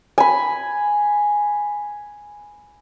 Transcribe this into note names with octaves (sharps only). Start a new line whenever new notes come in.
G#5 B5